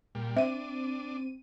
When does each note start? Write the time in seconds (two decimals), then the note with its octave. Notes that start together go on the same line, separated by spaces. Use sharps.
0.15 A#2 G3
0.37 C4 D4 E5 D#7